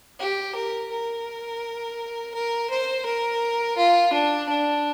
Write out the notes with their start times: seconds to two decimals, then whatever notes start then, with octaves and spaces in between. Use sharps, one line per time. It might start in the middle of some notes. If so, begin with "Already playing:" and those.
0.20 G4
0.55 A#4
0.91 A#4
2.34 A#4
2.70 C5
3.06 A#4
3.77 F4
4.13 D4
4.49 D4